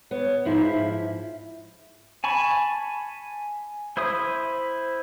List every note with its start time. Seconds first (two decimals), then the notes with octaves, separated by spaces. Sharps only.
0.11 B3 C#5
0.45 G#2 F3 D#4 E4
0.63 E5
2.24 G#5 A5 B5 C#6
3.97 E4 C5 E5 D#6